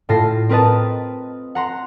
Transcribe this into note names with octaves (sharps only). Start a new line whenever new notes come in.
A2 F4 A5 A#6 C7
C4 A#4 B4 D#5 A5
F#5 A#5 C6